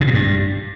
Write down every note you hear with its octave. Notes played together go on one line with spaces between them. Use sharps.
C3
A#2
G2